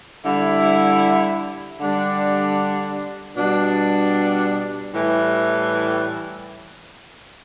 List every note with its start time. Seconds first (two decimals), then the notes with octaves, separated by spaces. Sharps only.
0.24 D3 G3 E4
1.80 D3 G3 D4
3.37 B2 G3 D4
4.93 A2 E3 G3